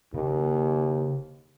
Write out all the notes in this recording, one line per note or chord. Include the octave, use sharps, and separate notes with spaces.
D#2 C#3 A#3